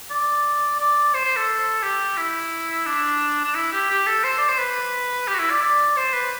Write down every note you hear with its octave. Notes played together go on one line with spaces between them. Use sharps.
D5
D5
C5
C5
A4
G4
E4
D4
D4
E4
G4
G4
A4
C5
D5
C5
B4
G4
F#4
E4
D5
D5
C5
B4